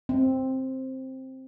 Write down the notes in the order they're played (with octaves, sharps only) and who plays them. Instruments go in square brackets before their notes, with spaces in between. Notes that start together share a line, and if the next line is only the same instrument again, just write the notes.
[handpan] C4